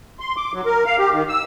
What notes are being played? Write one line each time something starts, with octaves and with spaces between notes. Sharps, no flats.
C6
D6
F#3
A#4
F5
G4
D#3
E6